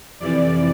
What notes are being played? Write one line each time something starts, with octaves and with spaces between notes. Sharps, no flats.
F2 C3 E3 D5